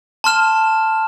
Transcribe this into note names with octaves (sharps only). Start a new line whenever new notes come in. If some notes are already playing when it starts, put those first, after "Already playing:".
A5 C6 F6 E7